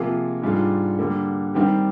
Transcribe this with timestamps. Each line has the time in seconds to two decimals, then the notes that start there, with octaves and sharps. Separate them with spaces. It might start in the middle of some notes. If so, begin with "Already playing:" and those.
Already playing: C3 F3 A#3 F4 G#4
0.42 G#2 G3 D4 F4 G#4
0.99 D3 G3 A#3
1.54 D#3 G3 C4 G4